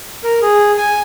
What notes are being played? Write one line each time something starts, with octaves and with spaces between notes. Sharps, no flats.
A#4
G#4
G#5